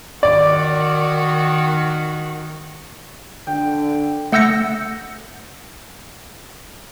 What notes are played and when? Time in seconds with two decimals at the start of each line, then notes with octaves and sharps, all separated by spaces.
0.23 D#3 F#4 D5
3.47 D3 G5
4.32 A3 F#5 E6 G6 A#6 C#7